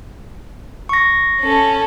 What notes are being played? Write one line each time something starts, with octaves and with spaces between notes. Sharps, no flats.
C#6 A#6
C#4 A4